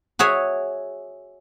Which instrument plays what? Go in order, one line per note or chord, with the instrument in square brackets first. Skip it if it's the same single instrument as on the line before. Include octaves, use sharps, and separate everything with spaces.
[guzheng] F#4 G#4 C#5 E5